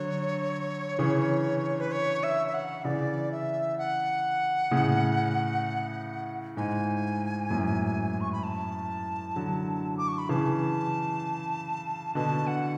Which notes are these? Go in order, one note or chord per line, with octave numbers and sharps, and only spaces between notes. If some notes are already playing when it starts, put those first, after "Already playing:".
Already playing: D3 F#3 C#5
C#3 E3
B4
C#5
E5
E5
F#5
C#3 E3 D5
E5
F#5
A2 C#3
G#2 G#5
F#2 A2
C#6
B5
A5
D3 F#3
D6
C#6
B5
C#3 E3 A5
B2 D3 A5
F#5